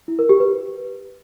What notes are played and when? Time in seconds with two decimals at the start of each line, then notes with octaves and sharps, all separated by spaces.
0.08 E4
0.19 A#4
0.29 G4
0.40 B4